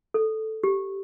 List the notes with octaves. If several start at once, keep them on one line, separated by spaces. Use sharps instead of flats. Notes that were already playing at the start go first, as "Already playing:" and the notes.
A4
G4